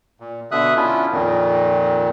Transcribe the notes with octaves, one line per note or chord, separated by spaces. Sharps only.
A#2
B2 D3 E5 D#6 F#6
C#4 D4 E4 F4
F2 A#2 D#3